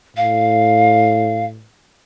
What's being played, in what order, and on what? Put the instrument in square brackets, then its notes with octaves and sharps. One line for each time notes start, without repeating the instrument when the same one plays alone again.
[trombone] A2 [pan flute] F5